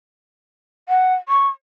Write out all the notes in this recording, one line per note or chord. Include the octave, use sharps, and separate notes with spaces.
F#5
C#6